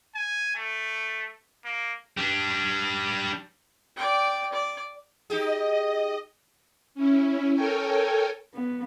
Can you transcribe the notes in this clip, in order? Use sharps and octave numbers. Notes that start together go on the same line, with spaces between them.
G#5
A3
A#3
G3 D4
D5 G5
D5
D#4 G4 G#4 D#5
C#4 E4
A4 A#4 C#5 G5 G#5
B3